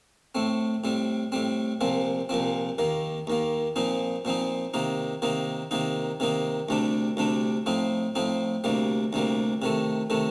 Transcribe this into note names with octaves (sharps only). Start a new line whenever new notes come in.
A2 A3 C4
A2 G3 C4
A2 G3 C4
C2 A#2 F3 C4
C2 A#2 F3 C4
D#2 D#3 A#3
D#2 D#3 A#3
A#2 F3 C4 D#4
A#2 F3 C4 D#4
C3 D#3 A#3 D#4
C3 D#3 A#3 D#4
C3 D#3 A#3 D#4
C3 D#3 A#3 D#4
D2 C3 G3 D4
D2 C3 G3 D4
A2 F3 C4 D#4
A2 F3 C4 D#4
D2 C3 G3 A#3
D2 C3 G3 A#3
C3 D#3 A3
C3 D#3 A3